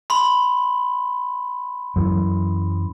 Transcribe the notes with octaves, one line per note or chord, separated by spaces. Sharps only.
B5 C6
F#2 E3